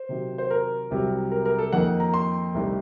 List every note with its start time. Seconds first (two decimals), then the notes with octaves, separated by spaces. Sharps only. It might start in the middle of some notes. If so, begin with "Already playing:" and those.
Already playing: C5
0.09 C3 D#3 F#3
0.38 C5
0.51 A#4
0.91 C2 C3 F#3
1.31 A#4
1.46 A#4
1.58 A4
1.73 F2 D#3 A#3 D#4 F#5
2.00 A#5
2.14 C6
2.55 C2 C3 D#3 A3 D#4